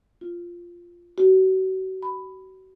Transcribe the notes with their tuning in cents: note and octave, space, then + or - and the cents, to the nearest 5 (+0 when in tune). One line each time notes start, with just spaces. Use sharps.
F4 -5
F#4 +35
B5 +10